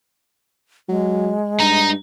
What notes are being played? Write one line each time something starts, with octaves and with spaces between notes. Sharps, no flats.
F#3 G#3
G2 D#4 A#5